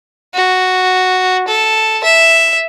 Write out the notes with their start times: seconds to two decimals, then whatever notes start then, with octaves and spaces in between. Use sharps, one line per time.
0.35 F#4
1.48 A4
2.04 E5